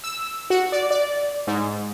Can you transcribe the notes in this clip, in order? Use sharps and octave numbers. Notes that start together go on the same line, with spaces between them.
E6
F#4
D5
D5
G#2